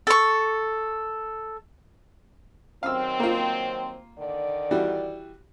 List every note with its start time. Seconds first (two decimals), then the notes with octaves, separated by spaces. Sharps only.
0.07 A4 C#6
2.83 D#3 F#3 C4 F5 E6
3.20 A#3 F4
4.18 D3 D#3 D5
4.71 E3 G3 F#4